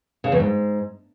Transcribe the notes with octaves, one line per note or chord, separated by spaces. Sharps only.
C#3
E2
G#2